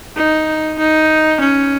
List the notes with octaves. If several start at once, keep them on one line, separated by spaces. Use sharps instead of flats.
D#4
D#4
C#4